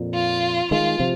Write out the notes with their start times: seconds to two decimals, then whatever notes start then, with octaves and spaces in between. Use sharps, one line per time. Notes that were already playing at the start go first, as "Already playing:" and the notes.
Already playing: F2 A#2
0.14 F4
0.71 D#3 G#3 F4
1.00 C3 F3